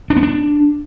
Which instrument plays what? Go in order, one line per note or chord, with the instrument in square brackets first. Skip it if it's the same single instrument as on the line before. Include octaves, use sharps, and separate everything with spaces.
[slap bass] D4
B3
D4